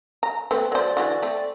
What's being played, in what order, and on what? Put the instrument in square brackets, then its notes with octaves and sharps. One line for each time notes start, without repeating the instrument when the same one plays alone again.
[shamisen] A#5
[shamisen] A3 B3 C4 [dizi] B4
[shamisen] F#3 C5 [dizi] D5
[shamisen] D3 E3 F#4
A3 C4